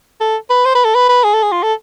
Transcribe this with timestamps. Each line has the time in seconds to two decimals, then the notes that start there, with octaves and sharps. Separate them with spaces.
0.21 A4
0.50 B4
0.65 C5
0.75 B4
0.85 A4
0.95 B4
1.09 B4
1.24 G#4
1.34 A4
1.43 G#4
1.52 F4
1.63 A4